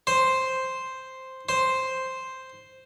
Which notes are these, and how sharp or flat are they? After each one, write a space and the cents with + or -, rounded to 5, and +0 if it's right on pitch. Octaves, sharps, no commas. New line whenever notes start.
C5 +0
C5 +0